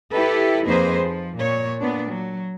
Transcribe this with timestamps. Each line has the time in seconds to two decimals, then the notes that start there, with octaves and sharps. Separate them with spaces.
0.12 E4 G4 A4 B4
0.64 F2 A#3 D#4 G#4 B4 C5
0.99 F3
1.37 A#2 C#5
1.80 A#2 B3 D4
2.10 F#3